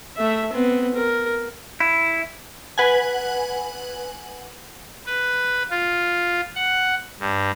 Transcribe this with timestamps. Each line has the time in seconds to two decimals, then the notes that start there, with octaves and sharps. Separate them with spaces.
0.17 A3 E5
0.52 B3 C4
0.95 A#4
1.80 E4
2.78 B4 F#5 G#5
5.06 B4
5.71 F4
6.56 F#5
7.20 G2